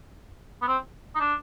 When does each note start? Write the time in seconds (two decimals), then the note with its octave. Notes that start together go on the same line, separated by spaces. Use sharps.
0.62 B3
0.68 C4
1.15 D#4
1.20 D4